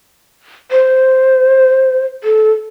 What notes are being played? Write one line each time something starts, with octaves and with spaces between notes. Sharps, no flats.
C5
A4